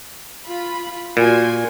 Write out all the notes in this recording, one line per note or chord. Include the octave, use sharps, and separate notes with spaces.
F4 B5
A#2 F#4 G#5 C6